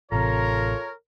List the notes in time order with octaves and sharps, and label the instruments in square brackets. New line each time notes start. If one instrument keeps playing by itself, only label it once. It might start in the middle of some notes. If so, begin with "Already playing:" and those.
[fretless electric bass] A1 C3 [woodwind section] F4 A4 A#5 [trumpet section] A#4 C#5